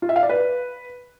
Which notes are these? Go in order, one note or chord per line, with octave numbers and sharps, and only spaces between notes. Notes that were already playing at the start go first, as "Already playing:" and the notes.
F4
E5
F5
D5
B4